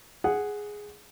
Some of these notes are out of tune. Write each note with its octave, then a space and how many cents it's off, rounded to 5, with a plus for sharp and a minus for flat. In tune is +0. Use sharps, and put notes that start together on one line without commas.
G#4 +0 F#5 +0